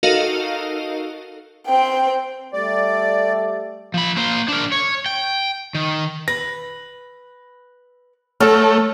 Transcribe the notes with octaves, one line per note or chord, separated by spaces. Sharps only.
D#4 F#4 A4 A#4 D#5 F5
C4 G5
G3 A3 D5
F3 B5
A#3 C5
D4 A#4
C#5
G5
D#3
B4 A#6
F#3 A3 A4 A5 F6